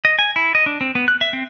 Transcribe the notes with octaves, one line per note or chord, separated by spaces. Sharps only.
D#5
G#5
E4
D#5
D4
C4
B3
F#6
E5
C4